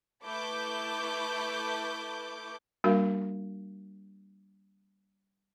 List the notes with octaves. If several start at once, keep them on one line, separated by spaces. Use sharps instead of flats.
A3 E4 B4 A5 D6 G6
G3 A#3 D4 F#4 A#4 F5